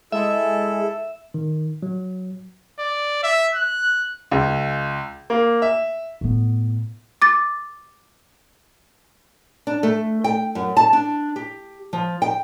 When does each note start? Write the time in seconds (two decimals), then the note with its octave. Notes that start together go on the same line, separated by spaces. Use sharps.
0.12 G#3 E4 A4 E5
1.34 D#3
1.83 F#3
2.79 D5
3.23 E5
3.55 F#6
4.31 C#2
5.30 A#3
5.62 E5
6.21 A2 B3
7.22 D6 A6
9.67 D4
9.83 A3
10.24 G5
10.55 F#2
10.77 A5
10.93 D4
11.36 G4
11.93 F3
12.22 G5